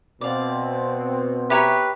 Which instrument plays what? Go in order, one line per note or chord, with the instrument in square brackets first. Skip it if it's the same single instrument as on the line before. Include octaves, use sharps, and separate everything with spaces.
[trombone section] B2 C4 [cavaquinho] D5 F5
[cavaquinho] G4 C#5 C#6 [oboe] B4 [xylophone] E5 A#5